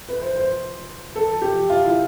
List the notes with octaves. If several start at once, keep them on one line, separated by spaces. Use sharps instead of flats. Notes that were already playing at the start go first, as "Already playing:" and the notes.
B4
C5
C5
A4
G4
F4
E4